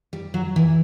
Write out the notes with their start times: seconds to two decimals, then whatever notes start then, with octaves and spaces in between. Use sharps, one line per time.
0.13 G3
0.34 F#3
0.56 E3